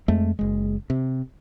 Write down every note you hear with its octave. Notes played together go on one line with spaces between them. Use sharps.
F2 G#3 A3
F#1 G#3
C3